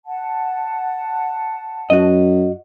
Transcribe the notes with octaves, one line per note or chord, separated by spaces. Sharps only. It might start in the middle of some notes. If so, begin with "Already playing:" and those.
F#5 A5
F#2 F#4 D#5